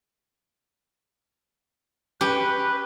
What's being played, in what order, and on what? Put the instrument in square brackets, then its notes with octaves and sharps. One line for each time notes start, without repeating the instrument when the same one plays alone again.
[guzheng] C#4 G4 [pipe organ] B4